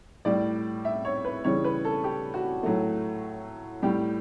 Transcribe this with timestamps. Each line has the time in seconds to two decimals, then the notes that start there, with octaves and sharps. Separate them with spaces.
0.25 A2 G3 D5
0.85 E5
1.05 C#5
1.25 B4
1.44 C#3 E3 G3 C#5
1.64 B4
1.85 A4
2.04 G4
2.34 F#4
2.63 A2 F#3 A3
3.82 A2 G3 G4